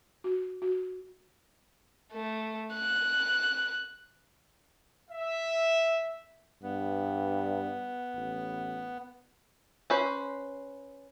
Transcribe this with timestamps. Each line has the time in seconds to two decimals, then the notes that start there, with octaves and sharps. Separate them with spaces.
0.24 F#4
0.62 F#4
2.13 A3
2.74 F#6
5.11 E5
6.63 G2 B3
8.15 A1
9.90 C#4 B4 C5